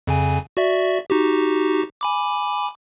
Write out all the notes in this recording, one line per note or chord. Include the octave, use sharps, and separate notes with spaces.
F2 C#3 G#5
F#4 D5 E5
D#4 F#4 G4
G#5 B5 D6